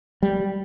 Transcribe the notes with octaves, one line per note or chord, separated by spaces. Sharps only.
G3